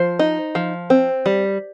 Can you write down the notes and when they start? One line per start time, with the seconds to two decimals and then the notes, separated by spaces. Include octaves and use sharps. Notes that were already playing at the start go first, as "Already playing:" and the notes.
Already playing: F3 C5
0.19 D#4
0.55 F3
0.90 C4
1.26 G3